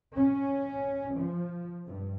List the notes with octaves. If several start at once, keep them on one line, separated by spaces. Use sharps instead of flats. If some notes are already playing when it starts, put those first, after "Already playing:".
C#4
F3
G2